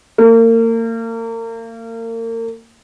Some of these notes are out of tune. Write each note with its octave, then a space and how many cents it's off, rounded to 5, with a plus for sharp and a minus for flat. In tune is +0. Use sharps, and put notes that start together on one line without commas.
A#3 -35